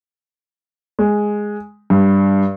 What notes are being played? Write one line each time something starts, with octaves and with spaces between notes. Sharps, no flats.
G#3
G2